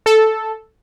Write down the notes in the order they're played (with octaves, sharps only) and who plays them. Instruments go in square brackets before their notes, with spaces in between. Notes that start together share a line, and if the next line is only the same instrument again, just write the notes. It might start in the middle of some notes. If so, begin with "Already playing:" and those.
[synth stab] A4